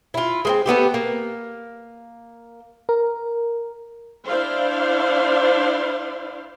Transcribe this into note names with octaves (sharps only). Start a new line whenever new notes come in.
E4 F4
G#3 A#3 C4
A3 B3 E4 G4
A#3
A#4
D4 E4 C5 F5